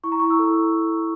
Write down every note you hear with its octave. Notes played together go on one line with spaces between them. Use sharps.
E4 C#6
A#5
E4 C#6
E6
A4